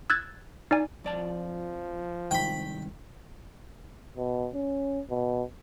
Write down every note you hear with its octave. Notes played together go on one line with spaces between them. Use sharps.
E6 F#6 G#6 A6
D#4 D5 G#5
F2 F3 D5 A5
C2 G#2 D#3 G5 B5
B2
C#4
B2